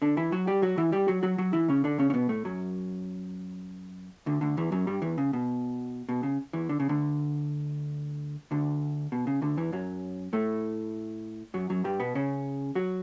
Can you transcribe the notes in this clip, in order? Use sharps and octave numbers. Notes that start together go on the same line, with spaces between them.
D3 D4
E3 E4
F#3 F#4
G3 G4
F#3 F#4
E3 E4
G3 G4
F#3 F#4
F#3 F#4
F#3 F#4
E3 E4
C#3 C#4
D3 D4
C#3 C#4
C#4
B2 B3
A2 A3
F#2 F#3
D2 D3
D2 D3
E2 E3
F#2 F#3
G2 G3
E2 E3
C#3
B2
B2
C#3
E2 E3
D3
C#3
D2 D3
D2 D3
B2
C#3
D2 D3
E2 E3
F#2 F#3
A2 A3
F#2 F#3
F#2 F#3
G2 G3
B2 B3
C#3 C#4
F#3 F#4